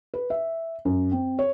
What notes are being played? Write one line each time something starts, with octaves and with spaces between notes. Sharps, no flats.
B4
E5
F#2
C4
C#5